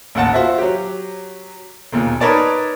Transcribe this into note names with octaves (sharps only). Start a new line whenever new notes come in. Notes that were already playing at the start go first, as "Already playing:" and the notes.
A1 D#2 F#5 A5
F4 F#4 C5 E5
F#3 G4
E1 D#2 A#2
D#4 A#4 B4 C#5 D5 A5